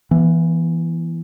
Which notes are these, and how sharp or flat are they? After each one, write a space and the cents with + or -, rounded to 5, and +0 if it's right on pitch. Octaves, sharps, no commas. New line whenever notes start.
E3 +10 B3 -35